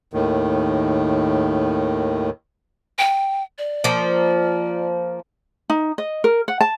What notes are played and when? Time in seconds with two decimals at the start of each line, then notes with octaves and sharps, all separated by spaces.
0.14 D#2 A2 D#3
2.98 G5
3.58 D5
3.84 F3 A#3
5.70 D#4
5.98 D#5
6.24 A#4
6.48 F#5
6.61 A5